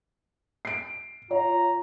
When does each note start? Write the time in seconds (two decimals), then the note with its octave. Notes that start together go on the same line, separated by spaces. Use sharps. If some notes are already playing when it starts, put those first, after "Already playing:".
0.65 C7 D7
1.31 F4 C#5 A#5